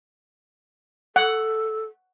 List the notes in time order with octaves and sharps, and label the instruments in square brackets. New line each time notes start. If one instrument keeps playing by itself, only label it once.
[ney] A4 [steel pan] F#5